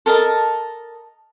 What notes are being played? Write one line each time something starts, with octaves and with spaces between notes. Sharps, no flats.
A4 A#4 D#5 A5